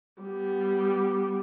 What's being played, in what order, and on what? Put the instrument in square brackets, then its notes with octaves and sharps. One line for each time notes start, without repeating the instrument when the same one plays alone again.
[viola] G3 B3